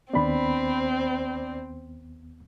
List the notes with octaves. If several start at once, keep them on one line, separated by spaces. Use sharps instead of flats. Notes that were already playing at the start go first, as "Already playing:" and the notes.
D#2 B3 C4 D4 B5